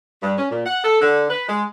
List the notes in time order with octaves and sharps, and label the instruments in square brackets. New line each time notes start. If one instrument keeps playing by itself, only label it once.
[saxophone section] G2
C#4
A#2
F#5
A4
D3
B4
G#3